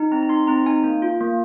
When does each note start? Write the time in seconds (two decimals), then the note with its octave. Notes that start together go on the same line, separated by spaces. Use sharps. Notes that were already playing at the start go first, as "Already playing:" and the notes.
Already playing: D#4
0.12 C4 A#5
0.23 A#5
0.29 D#4 C6
0.47 C4 A#5
0.66 D#4 G#5
0.84 A#3
1.02 F4
1.21 A#3